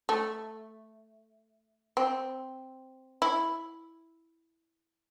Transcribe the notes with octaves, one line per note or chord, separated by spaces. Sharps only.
A3
C4
E4